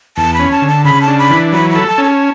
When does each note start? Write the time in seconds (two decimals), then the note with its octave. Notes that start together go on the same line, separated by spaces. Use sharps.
0.17 E2 A5
0.34 B5
0.39 C#4
0.51 A5
0.62 D3
0.68 A5
0.85 C#3 B5
1.01 A5
1.08 D4
1.19 B5
1.30 E3
1.52 F#3 B5
1.70 B5
1.75 A4
1.86 A5
1.98 C#4
2.04 A5